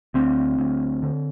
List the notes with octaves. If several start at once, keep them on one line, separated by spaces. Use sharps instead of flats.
D2 C4
D2
D3